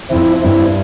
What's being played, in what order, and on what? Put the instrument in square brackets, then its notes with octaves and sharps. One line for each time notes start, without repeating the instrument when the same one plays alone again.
[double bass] F2 [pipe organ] C4 E4
[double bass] G2 [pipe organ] C4 E4